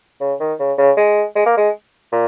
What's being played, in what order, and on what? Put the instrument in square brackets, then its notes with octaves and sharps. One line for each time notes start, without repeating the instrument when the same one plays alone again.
[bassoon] C#3
D#3
C#3
C#3
G#3
G#3
A#3
G#3
A#2